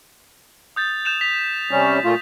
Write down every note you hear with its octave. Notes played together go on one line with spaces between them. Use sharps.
D#6 G6 A6
G6 E7 F7
B6 F7
C3 G3 C#4
A#2 A3 F4